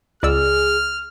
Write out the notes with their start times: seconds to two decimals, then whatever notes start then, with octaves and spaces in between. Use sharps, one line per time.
0.23 C#2 G#4 D5 E6 F6